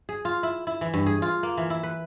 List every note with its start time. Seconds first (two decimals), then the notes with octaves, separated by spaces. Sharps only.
0.09 G#4
0.25 F4
0.43 E4
0.67 E4
0.81 E3
0.94 G2
1.06 G#4
1.22 F4
1.43 A#3
1.58 E3
1.70 E4
1.83 B4